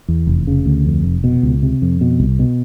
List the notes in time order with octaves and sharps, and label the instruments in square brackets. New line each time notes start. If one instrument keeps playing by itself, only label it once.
[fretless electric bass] E2
F1
C#3
D2
F2
F1
B2
C#2
C3
F2
B2
C2
B2